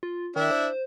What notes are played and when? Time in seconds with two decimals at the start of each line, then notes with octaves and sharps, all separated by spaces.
0.03 F4
0.36 D#3 D4 E4 E5
0.51 C5